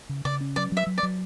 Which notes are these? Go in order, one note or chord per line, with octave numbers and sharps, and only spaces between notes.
C#3
C#3 D5
C#4
F#3 D5
F#3 E5
F#3
D5
F#3